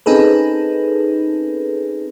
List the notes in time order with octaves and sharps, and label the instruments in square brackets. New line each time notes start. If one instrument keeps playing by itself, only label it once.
[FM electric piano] C4 C#4 D#4 G#4 A4 B4